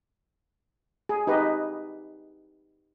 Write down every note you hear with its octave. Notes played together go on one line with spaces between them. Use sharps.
G#4
D#4 G4 B4 D#5